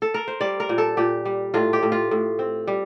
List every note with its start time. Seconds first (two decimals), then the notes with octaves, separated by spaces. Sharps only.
0.02 A4
0.14 A#4
0.28 C5
0.41 G3 D5
0.60 A#4
0.69 A#2
0.78 A4
0.97 A#2 G4
1.25 G3
1.54 A2 F4
1.73 G4
1.83 A2
1.92 F4
2.11 A2
2.39 C4
2.68 G3